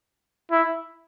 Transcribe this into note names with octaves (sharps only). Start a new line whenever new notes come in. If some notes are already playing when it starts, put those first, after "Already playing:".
E4